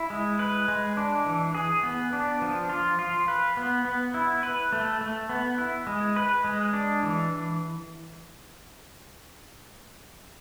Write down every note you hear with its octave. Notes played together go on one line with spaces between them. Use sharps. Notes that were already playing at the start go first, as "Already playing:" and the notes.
Already playing: E4
G#3
B4
G#3
D4
E3
G#4
B3
D4
F3
F4
F4
B4
B3
B3
E4
B4
A3
A3
B3
E4
G#3
B4
G#3
D4
E3